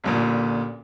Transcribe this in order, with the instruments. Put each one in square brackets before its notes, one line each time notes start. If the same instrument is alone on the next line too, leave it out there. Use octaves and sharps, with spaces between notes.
[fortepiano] A1 D2 A#2